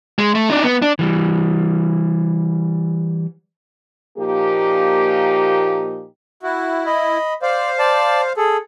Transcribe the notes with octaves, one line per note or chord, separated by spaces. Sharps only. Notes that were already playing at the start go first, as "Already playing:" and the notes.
G#3
A3
D4 D#4
B3
D4
E3 G3
A#2 F3 A#3 D#4 G4
E4 F#4
D#5 B5
C5 D5 F5
D5 A5
G#4 A4